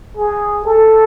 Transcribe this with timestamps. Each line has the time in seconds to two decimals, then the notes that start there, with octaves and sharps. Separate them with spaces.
0.17 G#4
0.65 A4